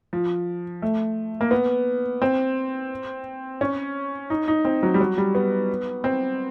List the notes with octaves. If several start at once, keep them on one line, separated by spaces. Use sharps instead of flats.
F3
A3
A#3
B3
C4
C#4
D#4
D#4
C4
F#3
G3
F#3
G3
B3
C4